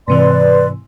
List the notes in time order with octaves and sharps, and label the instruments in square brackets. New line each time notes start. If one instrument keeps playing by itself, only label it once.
[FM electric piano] G#2 C3 E3 [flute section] B4 D5 C6